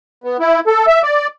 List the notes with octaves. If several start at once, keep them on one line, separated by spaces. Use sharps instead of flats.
B3
E4
A4
E5
D5